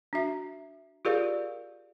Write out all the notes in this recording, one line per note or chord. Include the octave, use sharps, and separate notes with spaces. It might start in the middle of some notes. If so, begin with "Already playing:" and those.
D4 F#4 E5
F4 G4 G#4 A#4 D5 F5